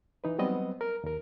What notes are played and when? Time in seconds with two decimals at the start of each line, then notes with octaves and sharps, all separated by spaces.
0.24 E3 D#4 B4
0.38 F#3 G3 B3 C4 D#5
0.81 A#4
1.04 D#2 A#4